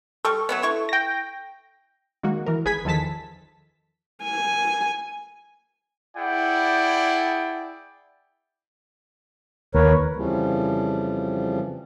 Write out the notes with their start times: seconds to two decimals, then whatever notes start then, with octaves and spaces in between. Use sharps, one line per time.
0.25 G3 A4 C#6
0.49 F#3 A3 B3
0.63 E4 C#6
0.89 G5 A#6
2.23 D#3 G#3 A#3 F#4
2.46 E3 A#4
2.65 G#1 G#4 B4 G#5 G#6 B6
2.85 E2 D#3 F3 A4 A5 B6
4.24 G#5
6.16 E4 G#4 D5 F#5 G5
9.75 D#2 A#4 B4 C#5
10.16 F2 C#3 E3 F3 G3